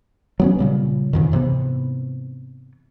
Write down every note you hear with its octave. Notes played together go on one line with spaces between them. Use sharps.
F#3 B3 C#4
A#2 C#3 G3
A1 F2 D#3
G#2 C3 E3 B3